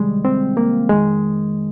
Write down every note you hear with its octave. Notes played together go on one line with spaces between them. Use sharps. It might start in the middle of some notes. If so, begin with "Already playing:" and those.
Already playing: C2 C3 D#3 G3 G#3
C4
A#3
F2 D#3 G#3